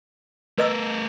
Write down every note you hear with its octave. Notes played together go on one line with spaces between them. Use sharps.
A3 A#4 B4 D#5 E6